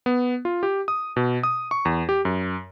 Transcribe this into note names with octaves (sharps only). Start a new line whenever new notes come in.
B3
F4
G4
D#6
B2
D#6
C#6
E2
G4
F#2